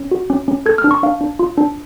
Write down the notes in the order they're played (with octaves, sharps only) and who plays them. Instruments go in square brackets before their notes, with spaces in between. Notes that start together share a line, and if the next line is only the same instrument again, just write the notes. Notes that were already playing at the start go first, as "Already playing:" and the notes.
Already playing: [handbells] C#4
F#4
C#4
C#4
A4 G#6
F6
D4
C#6
D4 F5
D4
F4
D4